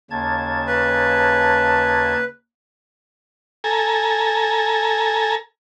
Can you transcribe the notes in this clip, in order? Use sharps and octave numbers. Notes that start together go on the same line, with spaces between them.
D#2 C#3 A5 G#6
B4
A4 G#5 A#5